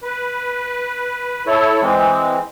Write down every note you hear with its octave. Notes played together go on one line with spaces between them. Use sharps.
B4
E4 A4 C#5
E3 G#3 C4